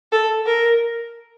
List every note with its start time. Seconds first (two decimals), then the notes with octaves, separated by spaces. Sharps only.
0.12 A4
0.46 A#4